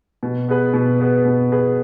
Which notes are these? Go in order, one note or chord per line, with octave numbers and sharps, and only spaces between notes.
B2
B3 G#4 B4
B2
B3 G#4 B4
B2
B3 G#4 B4